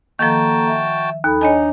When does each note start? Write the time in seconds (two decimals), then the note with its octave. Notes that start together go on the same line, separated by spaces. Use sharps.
0.19 D#3 F3 A#3 F#4 A4 G5 A5 A#5
0.67 E5
1.24 D#2 D#4 A4 B5
1.41 D4 D#4 C#5 D#5 G#5